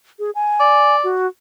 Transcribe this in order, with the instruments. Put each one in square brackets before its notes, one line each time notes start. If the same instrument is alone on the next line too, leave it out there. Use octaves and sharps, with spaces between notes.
[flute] G#4
G#5
[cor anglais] D5
[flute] F#4